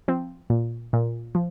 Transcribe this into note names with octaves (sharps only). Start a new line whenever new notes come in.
F3 C4
A#2
A#2
F3